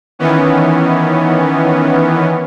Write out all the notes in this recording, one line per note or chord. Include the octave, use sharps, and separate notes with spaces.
D#3 E3 B3 C#4